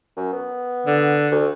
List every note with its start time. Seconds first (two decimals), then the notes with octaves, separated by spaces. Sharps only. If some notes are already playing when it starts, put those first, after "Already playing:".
0.16 F#2
0.33 B3
0.87 D3
1.32 D2